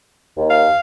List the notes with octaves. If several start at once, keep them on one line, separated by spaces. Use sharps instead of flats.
D#2
F5